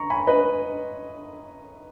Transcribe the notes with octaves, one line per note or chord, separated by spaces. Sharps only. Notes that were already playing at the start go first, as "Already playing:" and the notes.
Already playing: A#5 C#6
G#5 B5
B4 D#5